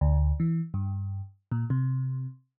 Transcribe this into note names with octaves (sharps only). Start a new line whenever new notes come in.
D2
E3
G2
A#2
C3